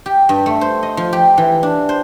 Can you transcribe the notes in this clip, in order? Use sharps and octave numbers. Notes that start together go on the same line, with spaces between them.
G4
G2
A3
C5
D#5
F3
G4
E3
D4
C5